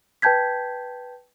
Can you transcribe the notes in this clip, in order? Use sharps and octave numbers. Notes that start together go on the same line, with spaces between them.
B4 G5 A5 G6 G#6 B6